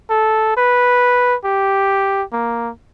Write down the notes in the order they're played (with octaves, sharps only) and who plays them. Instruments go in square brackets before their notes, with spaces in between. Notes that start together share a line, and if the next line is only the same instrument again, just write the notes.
[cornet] A4
B4
G4
A#3